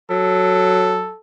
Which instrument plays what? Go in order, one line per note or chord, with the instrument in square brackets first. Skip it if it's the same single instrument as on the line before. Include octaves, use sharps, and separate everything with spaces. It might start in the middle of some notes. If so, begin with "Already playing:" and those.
[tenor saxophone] F#3 [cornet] A4